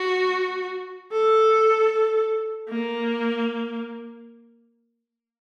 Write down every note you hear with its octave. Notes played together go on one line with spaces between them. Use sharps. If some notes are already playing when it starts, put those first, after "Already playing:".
Already playing: F#4
A4
A#3